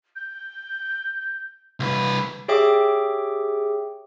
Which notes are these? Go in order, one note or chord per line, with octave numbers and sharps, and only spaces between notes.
G6
C2 B4
G4 G#4 C#5 E5 G5 D6